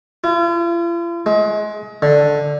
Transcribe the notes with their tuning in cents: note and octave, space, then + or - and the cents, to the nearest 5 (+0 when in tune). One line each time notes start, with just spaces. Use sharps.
F4 -45
G#3 +30
D3 +0